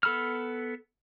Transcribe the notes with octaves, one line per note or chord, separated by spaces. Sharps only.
B3 A4 B5 E6 F6